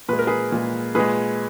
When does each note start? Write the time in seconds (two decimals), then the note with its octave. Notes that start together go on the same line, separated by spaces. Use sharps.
0.09 A#2 G#3 B4
0.19 A#4
0.27 G#4 B4
0.52 A#2 G#3
0.95 A#2 G#3 G#4 B4